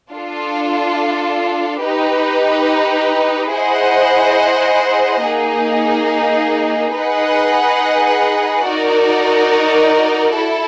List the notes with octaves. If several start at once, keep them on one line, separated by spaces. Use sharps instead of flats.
D4 F4 A4
D#4 G4 B4
E4 G#4 C5 D#5 F#5
A#3 D#4 G#4
D#4 G#4 B4 D#5 F#5
D#4 F#4 A#4 D5
E4 A4